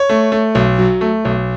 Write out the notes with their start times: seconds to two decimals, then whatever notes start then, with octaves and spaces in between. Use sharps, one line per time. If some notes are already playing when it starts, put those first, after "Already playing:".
Already playing: C#5
0.09 A3
0.32 A3
0.55 B1
0.79 F#3
1.01 A3
1.25 B1